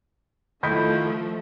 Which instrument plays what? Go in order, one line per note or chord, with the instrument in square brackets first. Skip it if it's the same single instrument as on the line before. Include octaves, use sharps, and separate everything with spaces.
[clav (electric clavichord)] D#3 D#4 E4 [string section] F3 A3 [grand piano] D#5 B5 G6